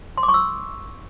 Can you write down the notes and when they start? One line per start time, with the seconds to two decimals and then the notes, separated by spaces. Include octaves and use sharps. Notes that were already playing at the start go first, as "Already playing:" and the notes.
0.18 C6
0.23 D6
0.29 C#6
0.34 E6